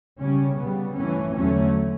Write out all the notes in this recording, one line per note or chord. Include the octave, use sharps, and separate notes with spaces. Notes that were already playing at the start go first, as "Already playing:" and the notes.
C#3 G3 C#4
C#3 G3 B3
G2 E3 A3 C#4
E2 D3 F#3 A3 C#4